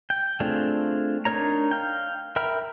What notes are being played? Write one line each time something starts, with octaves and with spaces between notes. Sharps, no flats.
G5
A3 C4 D4 F4 G#4
D4 D#4 A#4 C#5 A#5
F5 G5
A#4 E5 G5 B5 F6